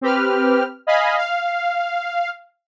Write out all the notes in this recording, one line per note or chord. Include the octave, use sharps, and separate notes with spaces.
C4 G4 B4 F6
D#5 F5 G#5 B5
F5